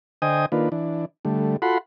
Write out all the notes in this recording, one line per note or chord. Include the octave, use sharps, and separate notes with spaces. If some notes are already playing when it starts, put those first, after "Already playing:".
D3 C5 D#5 G5 G#5 D#6
D#3 A#3 D4 F4 B4
E3 D4
D3 G3 A3
F4 F#4 A4 F#5 B5 C6